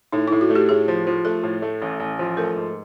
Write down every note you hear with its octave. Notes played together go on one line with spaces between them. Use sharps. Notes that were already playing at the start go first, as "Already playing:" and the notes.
A2 D#4
E4
A2
F#4
A3
G4
A2 G#4
F3
F3
A3 A4
A2
A3
A1
A1
F3
A3 A#4
G#2